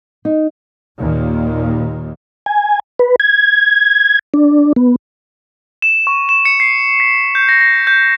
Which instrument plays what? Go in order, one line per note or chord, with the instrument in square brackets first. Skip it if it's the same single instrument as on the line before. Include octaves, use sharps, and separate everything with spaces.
[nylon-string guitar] D#4
[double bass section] D#2 A#2 D#3
[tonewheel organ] G#5
B4
G#6
D4
B3
[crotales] E7
C#6
E7
C#7
C7
B6
G6
A#6
A#6
G6